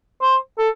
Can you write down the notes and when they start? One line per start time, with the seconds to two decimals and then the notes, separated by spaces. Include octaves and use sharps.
0.21 C5
0.58 A4